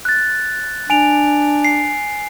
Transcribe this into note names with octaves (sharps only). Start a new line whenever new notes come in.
F#6 A6
D4 G#5 D7 F7
C7